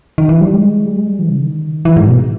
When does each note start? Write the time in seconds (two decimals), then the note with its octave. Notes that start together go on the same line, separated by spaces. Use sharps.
0.18 D#3
0.29 E3
0.41 G3
0.52 G#3
0.85 G3
0.96 G#3
1.08 G3
1.19 E3
1.29 C#3
1.41 D#3
1.85 E3
1.96 G#2
2.08 B2